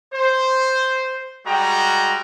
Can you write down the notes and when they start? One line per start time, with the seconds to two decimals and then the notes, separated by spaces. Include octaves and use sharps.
0.14 C5
1.46 G3 G#3 F#4 G5 A#5